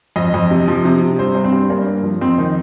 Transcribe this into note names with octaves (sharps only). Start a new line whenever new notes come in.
F2 D#5
F2
C3
F3
C3
C3
G2 C5
G2
C4
G2
G2 A#3
G2
F3
F2 C4
D#3 D#4